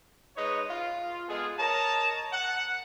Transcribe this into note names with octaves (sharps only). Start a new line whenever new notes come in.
G#3 D#4 B4 C#5 D#5
F4
G#3 B3 F4 G#4 A4
A#4 C#5 D#5 A5 A#5
F#5